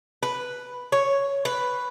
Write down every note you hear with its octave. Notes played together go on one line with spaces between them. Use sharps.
B4
C#5
B4